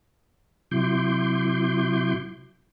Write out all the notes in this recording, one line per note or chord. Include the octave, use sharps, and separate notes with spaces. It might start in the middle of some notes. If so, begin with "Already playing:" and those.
C3 F#3 E4 C6 D6 G6